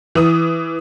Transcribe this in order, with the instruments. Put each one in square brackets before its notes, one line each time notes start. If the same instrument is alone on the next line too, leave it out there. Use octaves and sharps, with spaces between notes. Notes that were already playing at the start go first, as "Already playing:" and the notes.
[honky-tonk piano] E3 D#6